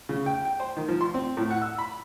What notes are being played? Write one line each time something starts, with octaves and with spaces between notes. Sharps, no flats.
C#3
G5
G5
C5
D#3
F3
C6
C4
A2
F#5
E6
B5